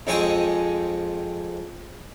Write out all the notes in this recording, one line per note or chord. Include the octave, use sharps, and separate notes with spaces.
F2 G#3 C4 G#5 C#6 D#6